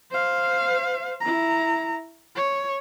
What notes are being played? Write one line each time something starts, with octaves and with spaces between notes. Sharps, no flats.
C5 F5
E4 A#5
C#5